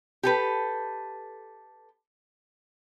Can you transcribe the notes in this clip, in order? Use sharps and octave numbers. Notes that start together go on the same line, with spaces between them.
G4 A4 B4